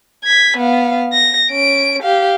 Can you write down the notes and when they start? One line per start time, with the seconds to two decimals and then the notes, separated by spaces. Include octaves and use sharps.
0.24 G#6 B6
0.57 B3 F5
1.13 A#6
1.51 C#4 D7
2.03 G4 F5